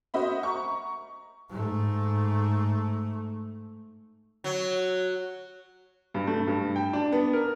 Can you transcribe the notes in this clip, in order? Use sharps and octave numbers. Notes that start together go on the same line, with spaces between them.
F#4 C5 D#5 E5 B5
A#5 C#6
G#2 A3
F#3
G2
A3
G2
G5
D4
B3
A#4